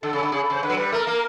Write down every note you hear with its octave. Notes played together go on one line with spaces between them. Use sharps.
D3 A4
C#3
D3
C#3 G#4
A4
C#3 C5
D3 B4
F#3
G3 B4
A3 A#4
A#3